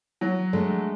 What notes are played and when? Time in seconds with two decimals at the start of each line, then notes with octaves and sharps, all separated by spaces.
0.21 F#3
0.53 G#3 A3 D4